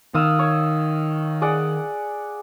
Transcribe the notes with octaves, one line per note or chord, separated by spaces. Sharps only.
D#3 F5 D#6 E6
C#5
G#4 D5 F#5